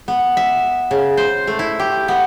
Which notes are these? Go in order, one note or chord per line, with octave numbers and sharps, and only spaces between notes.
B3
E5
C#3
C5
A3
E4
G4
B3